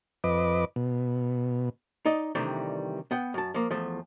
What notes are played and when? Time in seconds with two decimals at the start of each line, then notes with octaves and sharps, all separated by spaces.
0.24 F2 B4 D#5 D6
0.76 B2
2.05 D#4 D5 D#5
2.35 C3 D#3 E3 G3 A3 D4
3.11 B3 F#5 G5
3.34 F#2 A5
3.54 F3 A#3
3.71 E2 F3 A3